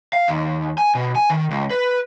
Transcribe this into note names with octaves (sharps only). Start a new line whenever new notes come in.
F5
D#2
G#5
B2
G#5
D#3
C#2
B4